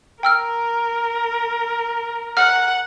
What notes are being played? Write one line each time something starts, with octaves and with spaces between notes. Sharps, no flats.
A#4 G5 E6 F6
F#5 F6